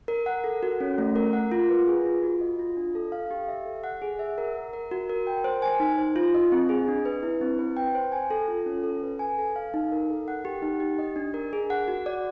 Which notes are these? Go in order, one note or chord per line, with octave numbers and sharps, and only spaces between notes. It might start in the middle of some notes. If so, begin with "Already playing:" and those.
A#4
F#5
A4
F#4
C#4
A3
A#4
F#5
F4
B4
G#4
F4
F#4
D#5
F4
D4
A4
F5
G4
E5
A4
F#5
G#4
E5
A#4
F#5
A#4
F#4
A#4
G5
C5
G#5
D#4
C5
F4
D#5
C4
G#4
D4
B4
E4
C4
B4
G5
C5
G#5
A4
F4
C#4
A4
B4
G#5
A4
F5
D#4
A#4
A4
F#5
G4
D#4
G4
D#5
D4
A#4
G#4
F#5
F#4
D5